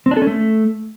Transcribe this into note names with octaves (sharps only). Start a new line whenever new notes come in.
C4
D4
A4
C#4
A3